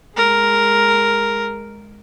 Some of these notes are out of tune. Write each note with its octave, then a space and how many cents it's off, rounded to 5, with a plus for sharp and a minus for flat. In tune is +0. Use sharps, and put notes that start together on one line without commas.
G#3 +0 A#4 +0